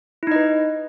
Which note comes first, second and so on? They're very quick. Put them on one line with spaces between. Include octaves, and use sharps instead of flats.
E4 D#4 D#5 B4